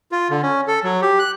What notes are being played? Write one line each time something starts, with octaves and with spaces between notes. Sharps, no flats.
F4
D3
C#4
A4
F#3
G4
F#6